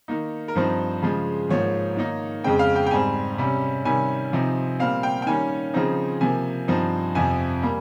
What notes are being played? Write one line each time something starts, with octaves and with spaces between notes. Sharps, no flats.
D#3 A#3 D#4
A#4
G2 F3 C4 D#4 C5
C#3 F3 G#3
G#2 F3 A#3 C#5
D#3 A#3 D#4
F2 C#3 G#3 C4 G5
F5
G5
G5
G#2 G3 C4 G#5
C3 G3 C#4
C3 D#3 G3 C#4 G#5
C3 F3 C4 D#4
A#2 G3 C4 F5
G5
G5
D#3 G3 A#3 C#4 G#5
C#3 F3 C4 D#4
C3 F3 A#3 G#5
G2 F3 C4 D#4
F2 C3 F3 C4 G#5
G3 A#3